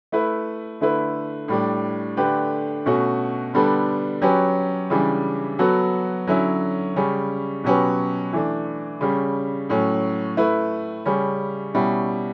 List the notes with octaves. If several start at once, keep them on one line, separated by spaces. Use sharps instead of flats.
A3 E4 B4
D3 A3 E4 B4
A2 G3 D4
D3 A3 D4 G4 B4
B2 A3 C#4 F#4
D3 G3 B3 D4 A4
F#3 C#4 G4 B4
C#3 E3 G3 D4
F#3 B3 F#4 A4
D3 F#3 C#4 E4
C#3 G3 C#4
B2 F#3 C#4 G4 B4
E3 A3 D4
C#3 G3 C#4
A2 F#3 C#4
A3 E4 B4
C#3 G3 C#4
B2 G3 C#4 E4